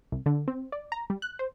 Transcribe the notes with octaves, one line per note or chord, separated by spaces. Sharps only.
C2
D3
C4
D5
A#5
G3
F#6
C5